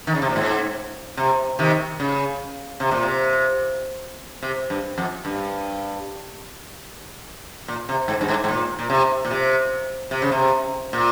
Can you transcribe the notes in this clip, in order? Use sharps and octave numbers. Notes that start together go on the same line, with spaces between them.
D#3
C#3
C3
A#2
G#2
C3
C3 D#3
C#3
C3
A#2
C3
C3
G2
F2
G2
A#2
C3
G#2
G2
G#2
G#2
A#2
A#2
C3
A#2
C3
C3
C#3
C3
A#2